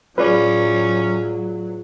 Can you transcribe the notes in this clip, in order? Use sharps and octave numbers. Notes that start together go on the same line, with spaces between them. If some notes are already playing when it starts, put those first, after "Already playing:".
A2 F#3 C#4 F4 G#4 B4 D5